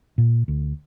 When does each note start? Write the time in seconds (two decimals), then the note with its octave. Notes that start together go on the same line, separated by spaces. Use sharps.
0.18 A#2
0.48 D2